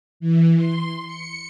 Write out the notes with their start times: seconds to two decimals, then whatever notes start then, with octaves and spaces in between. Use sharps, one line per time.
0.20 E3
0.57 C6
1.07 C#7